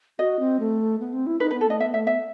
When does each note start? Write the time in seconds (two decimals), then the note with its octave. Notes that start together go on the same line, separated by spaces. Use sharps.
0.19 F#4 D#5
0.39 C4
0.60 A3
1.00 B3
1.13 C4
1.27 E4
1.40 D#4 B4
1.51 B4
1.53 B3
1.61 A4
1.67 A3 D#5
1.80 B3 E5
1.94 A3 E5
2.07 B3 E5